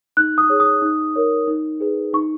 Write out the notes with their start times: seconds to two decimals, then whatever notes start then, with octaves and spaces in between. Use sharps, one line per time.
0.17 D#4 F#6
0.38 D#6
0.50 G#4 C#5
0.60 D#6
0.82 D#4
1.15 A#4 C#5
1.47 D#4
1.80 G#4 B4
2.13 D#4 C#6